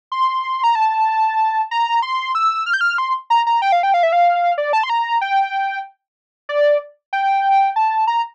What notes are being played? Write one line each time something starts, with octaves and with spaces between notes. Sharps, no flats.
C6
A#5
A5
A#5
C6
E6
F6
G6
F6
C6
A#5
A#5
G5
F5
G5
F5
E5
F5
D5
A5
C6
A#5
G5
D5
G5
A5
A#5